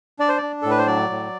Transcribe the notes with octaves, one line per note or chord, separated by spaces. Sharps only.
D4 D5
C5
D5
D4
A2 A4
B4
C5
F#3 D5
A2